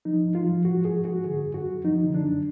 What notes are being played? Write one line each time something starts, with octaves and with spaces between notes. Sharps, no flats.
F3 D#4
G#2
F4
F3
G#2 F#4
F3 G#4
G#2 F#4
D3 G#4
F#2
F#4
F#2
F3 D#4
D3
D4
F#2